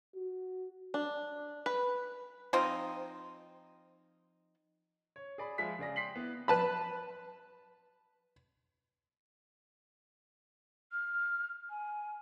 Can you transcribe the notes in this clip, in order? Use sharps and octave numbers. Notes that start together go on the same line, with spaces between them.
F#4
D4
B4
F3 C4 D#4
C#5
G#4 D5 B5
F3 G#3 E5 B6
C#3 G#4 D5 A#6
G5 C6 B6 C7 F#7
B3 E4
B4 A5 B5
F6
G#5